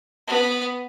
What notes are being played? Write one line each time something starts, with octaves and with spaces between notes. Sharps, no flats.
B3